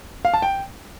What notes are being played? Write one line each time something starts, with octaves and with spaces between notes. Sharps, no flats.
F5
A5
G5